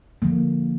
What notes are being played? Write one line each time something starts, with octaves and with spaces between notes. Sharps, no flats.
D3 F3 A#3